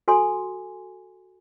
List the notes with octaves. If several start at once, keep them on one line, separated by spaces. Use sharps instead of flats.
F#4 A4 G#5 C6